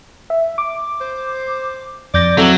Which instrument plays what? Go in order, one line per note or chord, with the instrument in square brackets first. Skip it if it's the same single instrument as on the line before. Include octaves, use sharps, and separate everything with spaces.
[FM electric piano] E5
D6
[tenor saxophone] C5
[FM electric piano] F2 G6 A#6 [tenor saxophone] D5
[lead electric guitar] F#3 [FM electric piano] C4 A4 [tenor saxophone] E4